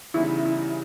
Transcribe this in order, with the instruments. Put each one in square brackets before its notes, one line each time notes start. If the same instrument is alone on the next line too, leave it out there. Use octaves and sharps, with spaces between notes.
[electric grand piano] C#3 E3 G3 B3 D#4 [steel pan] E4
[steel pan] E4